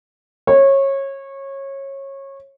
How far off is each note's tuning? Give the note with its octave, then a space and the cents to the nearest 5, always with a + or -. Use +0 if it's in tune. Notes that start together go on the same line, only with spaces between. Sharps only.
C#5 -20